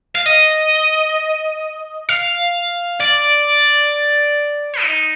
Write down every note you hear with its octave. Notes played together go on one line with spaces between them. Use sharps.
F5
D#5
F5
D5
D#4